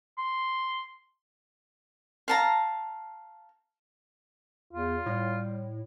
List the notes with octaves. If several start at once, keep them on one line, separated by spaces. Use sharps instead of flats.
C6
F5 A5 A#5
E2 F4
A2 G3